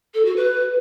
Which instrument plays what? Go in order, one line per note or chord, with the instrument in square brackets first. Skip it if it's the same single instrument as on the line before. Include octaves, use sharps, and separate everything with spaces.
[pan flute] A4
F#4
B4